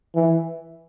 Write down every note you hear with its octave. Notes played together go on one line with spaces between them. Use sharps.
E3